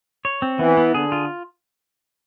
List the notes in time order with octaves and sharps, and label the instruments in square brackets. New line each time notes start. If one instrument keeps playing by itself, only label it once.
[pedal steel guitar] C#5
C4
[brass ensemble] E3 [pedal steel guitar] B3
[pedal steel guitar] B3
[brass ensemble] D3 [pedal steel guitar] G#4
[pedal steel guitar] F4